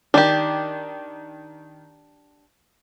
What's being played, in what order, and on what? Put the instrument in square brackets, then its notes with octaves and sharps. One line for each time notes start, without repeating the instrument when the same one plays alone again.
[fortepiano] D#3 [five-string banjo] D4 G4